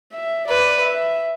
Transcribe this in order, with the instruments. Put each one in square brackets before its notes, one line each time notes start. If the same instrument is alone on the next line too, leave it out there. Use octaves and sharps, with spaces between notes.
[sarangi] E5
[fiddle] B4 [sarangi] D5
[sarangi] E5